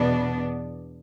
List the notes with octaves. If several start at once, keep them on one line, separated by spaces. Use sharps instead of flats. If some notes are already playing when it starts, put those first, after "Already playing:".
Already playing: E2 B2 B3 D4